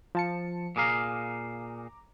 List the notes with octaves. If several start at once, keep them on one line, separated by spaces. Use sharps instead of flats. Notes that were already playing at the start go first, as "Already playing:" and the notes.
F3 A5 C#7
A#2 G#4 F5 A#5 D6